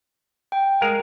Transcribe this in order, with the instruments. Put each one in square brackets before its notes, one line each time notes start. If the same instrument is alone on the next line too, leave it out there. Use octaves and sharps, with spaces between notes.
[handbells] G5
[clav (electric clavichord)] G#3 A#4 F5